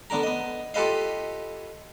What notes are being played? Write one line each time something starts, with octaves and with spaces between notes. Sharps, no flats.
D3 B3 D4 A#4 A#5
B3 D#5
F4 G4 A4 B4 D#5 F5